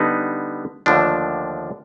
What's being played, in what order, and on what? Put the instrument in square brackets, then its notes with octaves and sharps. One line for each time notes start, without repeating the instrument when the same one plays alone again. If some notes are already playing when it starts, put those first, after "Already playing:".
Already playing: [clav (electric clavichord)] D3 G3 B3 D#4
D#2 D3 F3 A3 D4